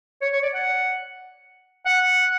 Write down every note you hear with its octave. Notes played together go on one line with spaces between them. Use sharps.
C#5
C#5
D5
F#5
F#5